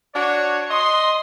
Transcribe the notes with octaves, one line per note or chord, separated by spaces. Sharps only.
D4 F#4 C#5
D#5 C6